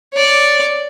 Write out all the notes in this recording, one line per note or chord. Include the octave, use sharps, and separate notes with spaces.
C#5 D5